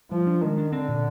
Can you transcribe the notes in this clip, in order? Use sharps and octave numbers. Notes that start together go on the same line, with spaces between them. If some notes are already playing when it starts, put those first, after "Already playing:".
F3 G3
D4
D#3 G#3
D4
D3 C4
A#2